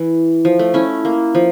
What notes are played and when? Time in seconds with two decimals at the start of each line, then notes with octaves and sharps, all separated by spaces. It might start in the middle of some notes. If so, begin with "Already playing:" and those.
Already playing: E3
0.45 F3
0.59 A3
0.74 C#4 E4
1.05 A#3
1.35 F3